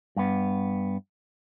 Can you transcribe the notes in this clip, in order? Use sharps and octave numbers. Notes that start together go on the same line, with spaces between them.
G2 B3